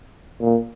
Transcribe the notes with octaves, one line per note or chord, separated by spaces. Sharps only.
A#2